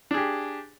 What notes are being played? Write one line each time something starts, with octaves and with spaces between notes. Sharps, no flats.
D4 G4 G#4